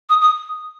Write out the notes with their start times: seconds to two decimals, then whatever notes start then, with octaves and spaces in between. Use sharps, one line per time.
0.09 D#6
0.21 D#6